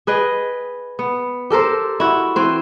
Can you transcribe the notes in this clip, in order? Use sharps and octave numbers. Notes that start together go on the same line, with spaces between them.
G#4 B4 D#5 G5
B3
G4 A4 A#4 C5
E4 F#4
E3 C4 C5